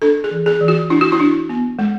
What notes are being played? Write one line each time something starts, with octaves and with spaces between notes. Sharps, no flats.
D4 A4
G#4
E3
G#4
E3
F#4
D4 E4
F#4
E4
D4
B3
G#3